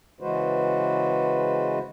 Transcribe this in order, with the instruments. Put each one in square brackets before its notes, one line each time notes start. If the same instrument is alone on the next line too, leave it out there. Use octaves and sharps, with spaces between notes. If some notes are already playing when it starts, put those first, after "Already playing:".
[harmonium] C#3 E3 G#3 F#4 B4 C5